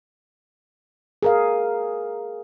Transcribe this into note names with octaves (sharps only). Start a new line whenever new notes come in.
G#4 A#4 F5